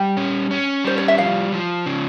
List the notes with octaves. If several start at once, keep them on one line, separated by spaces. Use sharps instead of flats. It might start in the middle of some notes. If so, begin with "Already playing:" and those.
Already playing: G3 G5
C#4
C#4
G3 C5
C#5
E5
F3 F5
F3
C#3